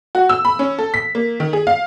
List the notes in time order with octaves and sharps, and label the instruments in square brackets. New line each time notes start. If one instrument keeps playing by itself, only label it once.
[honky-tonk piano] F#4
E6
B5
C#4
A4
B6
A#3
D#3
G#4
F5